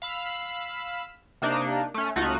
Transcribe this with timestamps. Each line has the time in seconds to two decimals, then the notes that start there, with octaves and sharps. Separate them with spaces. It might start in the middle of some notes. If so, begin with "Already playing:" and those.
0.02 F5 B5 E6
1.42 C3 A#3 D4 D#4
1.94 A3 C#4
2.16 C#2 A3 D#4 F4 F#4 F#6